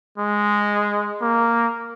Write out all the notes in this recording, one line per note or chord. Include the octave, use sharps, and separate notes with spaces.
G#3
A#3